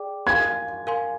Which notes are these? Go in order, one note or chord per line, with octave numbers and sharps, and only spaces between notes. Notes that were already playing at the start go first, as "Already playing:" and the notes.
Already playing: G#4 D5 G5 D6
A#4 F5 G#5 C6 G#6
A#4 F5 G#5 C6